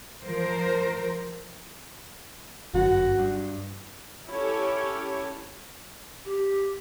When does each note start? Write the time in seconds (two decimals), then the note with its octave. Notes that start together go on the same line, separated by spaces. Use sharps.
0.24 F3 A#4 C5
2.74 G1 F#2 F#4
3.19 G2
4.29 C#4 E4 G4 A4 C#5
6.25 G4